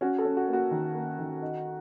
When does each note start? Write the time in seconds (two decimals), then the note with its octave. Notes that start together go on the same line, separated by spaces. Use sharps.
0.01 C#4 F#4
0.19 A4
0.25 C#4
0.37 F#4
0.48 A#3
0.53 F#4
0.71 D#3
0.95 A#3
1.19 D#3
1.42 D#4